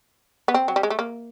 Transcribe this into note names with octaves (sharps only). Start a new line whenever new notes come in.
B3
C4
F#3
G3
G#3
A3
A#3